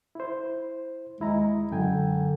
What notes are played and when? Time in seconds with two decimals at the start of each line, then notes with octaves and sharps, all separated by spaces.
0.15 E4 C5
1.20 D#2 G#3 E4 A#5
1.71 F#2 D3 G5 G#5